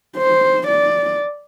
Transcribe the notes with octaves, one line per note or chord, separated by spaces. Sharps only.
C5
D5